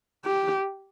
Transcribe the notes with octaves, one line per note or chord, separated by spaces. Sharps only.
G4